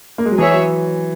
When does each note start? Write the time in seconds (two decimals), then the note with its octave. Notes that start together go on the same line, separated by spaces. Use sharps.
0.18 A#3
0.25 G#3
0.31 F#3
0.38 E3 G#4 C#5 E5
0.54 F#3